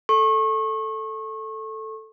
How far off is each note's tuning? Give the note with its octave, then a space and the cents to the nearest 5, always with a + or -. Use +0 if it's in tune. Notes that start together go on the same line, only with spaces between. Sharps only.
A4 +0 C#6 -30